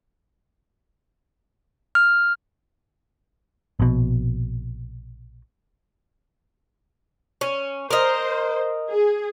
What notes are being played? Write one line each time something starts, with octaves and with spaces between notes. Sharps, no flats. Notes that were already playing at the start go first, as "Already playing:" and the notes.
F6
A#1 B2
C#4
A#4 C5 D#5
G#4